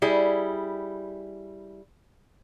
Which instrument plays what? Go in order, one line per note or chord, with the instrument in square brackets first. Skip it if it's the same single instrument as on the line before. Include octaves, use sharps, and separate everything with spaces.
[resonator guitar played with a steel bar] G3 E4 G#4